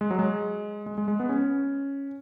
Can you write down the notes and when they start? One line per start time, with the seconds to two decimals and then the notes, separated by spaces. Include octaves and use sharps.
0.01 G#3
0.11 F#3
0.19 G#3
0.86 G#3
0.98 G#3
1.08 G#3
1.20 B3
1.29 C#4